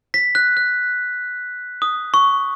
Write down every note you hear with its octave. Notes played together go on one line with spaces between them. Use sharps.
B6
F#6
F#6
D#6
C#6